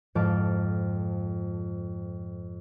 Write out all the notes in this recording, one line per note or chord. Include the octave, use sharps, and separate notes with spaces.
F2 G#2 F3 A4 F5 D6